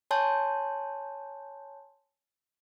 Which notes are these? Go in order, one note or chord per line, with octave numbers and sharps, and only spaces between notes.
C#5 G#5 A5 C6 G6